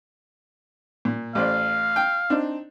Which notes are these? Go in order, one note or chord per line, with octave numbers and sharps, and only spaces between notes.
A#2
A1 C5 D5 F5
G5
C4 D4 D#4